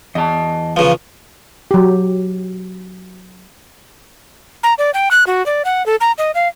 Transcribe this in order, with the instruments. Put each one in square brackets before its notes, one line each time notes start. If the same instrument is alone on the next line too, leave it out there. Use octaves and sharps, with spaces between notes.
[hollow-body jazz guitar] E2 [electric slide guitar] D#5 A5
[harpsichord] C#3 F3 [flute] B4
[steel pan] F#3 G4
[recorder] A#5
D5
G5
F#6
F#4
D5
F#5
A4
A#5
D#5
F5